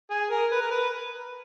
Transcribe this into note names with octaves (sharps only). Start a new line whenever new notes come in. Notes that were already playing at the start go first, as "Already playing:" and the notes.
G#4
A#4
B4
A#4
B4